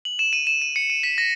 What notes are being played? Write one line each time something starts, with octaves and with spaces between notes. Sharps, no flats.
F#7
E7
D#7
E7
D#7
C#7
D#7
B6
A#6